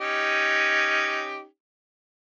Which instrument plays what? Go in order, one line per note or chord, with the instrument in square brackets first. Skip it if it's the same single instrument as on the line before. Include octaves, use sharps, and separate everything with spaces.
[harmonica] C#4 D#4 G4